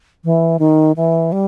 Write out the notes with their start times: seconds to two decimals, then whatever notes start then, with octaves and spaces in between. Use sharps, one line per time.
0.24 E3
0.59 D#3
0.96 E3
1.32 G3